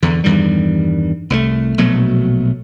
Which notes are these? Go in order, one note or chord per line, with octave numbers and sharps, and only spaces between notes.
E2 D3
E2 G2 D#3 G3
C2 F3 A3
A#1 B2 F#3 A3